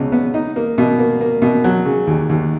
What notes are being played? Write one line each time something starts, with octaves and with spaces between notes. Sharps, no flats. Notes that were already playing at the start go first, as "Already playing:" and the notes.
Already playing: C#2 B2
B3
D#4
A#3
B2
A#3
A#3
B2
F#3
C#3
D#2
D#2